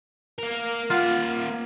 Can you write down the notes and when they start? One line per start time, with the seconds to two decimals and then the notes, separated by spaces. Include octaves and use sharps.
0.39 A#3 A#4
0.90 A#3 F4 F5 F#5